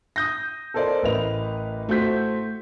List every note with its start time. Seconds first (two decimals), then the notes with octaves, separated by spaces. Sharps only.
0.16 D#6 G6 A#6
0.74 A4 A#4 C5 D5 D#5
1.03 A1 A#4 B4 D#5 F7
1.88 A2 A3 F#4 C5 G6 B6